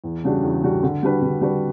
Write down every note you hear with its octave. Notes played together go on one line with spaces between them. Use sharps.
E2
C#3 G3 D4 F#4
E2
C#3 G3 D4 F#4
D3
G3 D4 F#4 B4
D3
G3 D4 F#4 B4